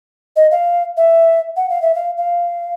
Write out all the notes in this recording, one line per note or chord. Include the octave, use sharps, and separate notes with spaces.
D#5
F5
E5
F#5
F5
E5
F5
F5